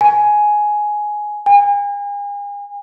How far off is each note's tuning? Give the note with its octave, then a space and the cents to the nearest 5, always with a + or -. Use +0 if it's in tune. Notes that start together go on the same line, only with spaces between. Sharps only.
G#5 +10
G#5 -40